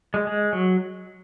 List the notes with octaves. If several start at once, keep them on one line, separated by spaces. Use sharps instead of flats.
G#3
G#3
F#3